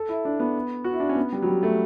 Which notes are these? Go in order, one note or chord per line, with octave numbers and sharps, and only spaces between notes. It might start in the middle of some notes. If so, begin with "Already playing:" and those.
Already playing: A4
E4
D4
B3
F#4
E4
D4
C#4
B3
G3
F#3
G3
A3